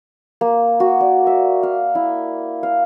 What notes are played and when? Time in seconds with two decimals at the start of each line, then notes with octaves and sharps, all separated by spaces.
0.41 A#3
0.80 F#4
1.01 D5
1.27 E5
1.63 F5
1.95 E4
2.63 F5